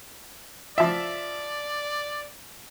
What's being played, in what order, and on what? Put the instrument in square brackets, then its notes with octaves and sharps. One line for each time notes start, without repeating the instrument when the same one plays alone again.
[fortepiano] F3 E5 [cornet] D5